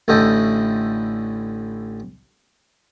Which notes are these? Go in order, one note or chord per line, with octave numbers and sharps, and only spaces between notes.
A1 A2 D3 A4 D#5 G5